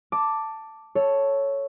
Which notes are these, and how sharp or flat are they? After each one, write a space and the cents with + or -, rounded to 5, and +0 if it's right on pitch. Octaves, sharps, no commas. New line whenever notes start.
A5 +10 D6 +0
A4 +0 C#5 +0